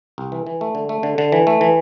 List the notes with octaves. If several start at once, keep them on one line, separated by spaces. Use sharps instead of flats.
C2
E3
E3
A3
D3
A3
D3
D3
E3
A3
E3